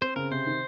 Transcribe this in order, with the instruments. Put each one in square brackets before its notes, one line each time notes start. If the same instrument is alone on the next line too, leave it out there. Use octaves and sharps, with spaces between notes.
[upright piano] C4 [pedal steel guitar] C5
[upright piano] C#3 [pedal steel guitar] A#4
[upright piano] C3 [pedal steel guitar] C5
[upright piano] D#3